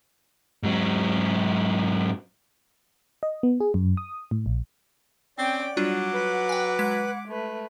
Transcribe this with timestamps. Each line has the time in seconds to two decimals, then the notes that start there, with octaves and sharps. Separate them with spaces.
0.63 G#2 F#3
3.23 D#5
3.43 B3
3.60 G#4
3.74 F#2
3.97 D#6
4.31 A2
4.46 A#1
5.38 C4 C#4 D5 G5
5.77 F#3 G3 D4 F4 F#5 D6
6.14 B4
6.49 G5 G#5
6.79 G#3 G#6 B6
7.28 A3 B4